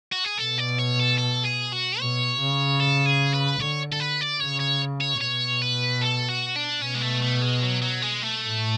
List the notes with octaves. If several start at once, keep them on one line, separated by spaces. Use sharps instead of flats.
F#4
G#4
B2 A4
D5
C#5
A4
A4
G#4
F#4
B2 C#5
C#3
A4
G#4
B4
D3 C#5
A4
B4
D5
C#3 C#5
C#5
C#5
B2 C#5
B4
A4
F#4
D4
B2 C#4
G#3
A3
A3
G#3
F#3
F#3
G#3
A3
A2